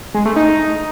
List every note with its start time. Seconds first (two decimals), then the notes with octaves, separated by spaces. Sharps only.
0.14 G#3
0.25 A3
0.36 D#4